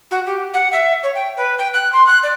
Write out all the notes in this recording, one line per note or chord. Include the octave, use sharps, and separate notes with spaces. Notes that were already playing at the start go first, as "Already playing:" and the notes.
F#4
G4
F#5
E5
C#5
G5
B4
G5
F#6
C6
F#6
D5